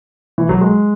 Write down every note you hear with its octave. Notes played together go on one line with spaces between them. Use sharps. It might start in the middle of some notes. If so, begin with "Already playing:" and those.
E3
F#3
G#3